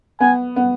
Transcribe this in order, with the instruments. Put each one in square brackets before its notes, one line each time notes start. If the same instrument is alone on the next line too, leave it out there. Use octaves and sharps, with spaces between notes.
[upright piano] B3 [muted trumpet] G#5
[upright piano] B3